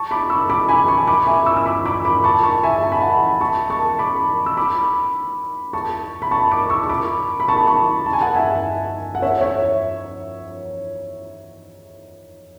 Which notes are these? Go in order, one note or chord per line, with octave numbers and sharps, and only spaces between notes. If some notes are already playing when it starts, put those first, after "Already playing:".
Already playing: A5 C#6
B5 D6
C#6 E6
B5 D6
G#5 B5
A5 C#6
B5 D6
E5 G#5
C#6 E6
E6
B5 D6
B5 D6
B5 D6
A5 C#6
A5 C#6
E5 G#5
A5
B5
F#5 A5
A5 C#6
A5 C#6
B5 D6
E6
B5 D6
A5 C#6
B5
A5 C#6
B5 D6
C#6 E6
C#6
B5 D6
B5
A5 C#6
A5 C#6
A5
G#5
F#5 A5
E5 G#5
F#5
C#5 E5
C#5 E5